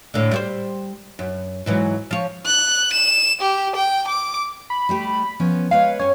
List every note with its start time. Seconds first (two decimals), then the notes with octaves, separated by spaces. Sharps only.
0.14 A2 D3
0.31 G3 F#4 C5
1.19 F#2
1.66 G#2 E3 F#3
2.11 F3 C#5
2.46 F#6
2.93 E7
3.41 G4
3.75 G5
4.07 D6
4.70 B5
4.89 G3 A3 G4
5.40 F3 B3 C#4
5.71 G#3 B4 C#5 F5
5.99 G2 C#4 C#5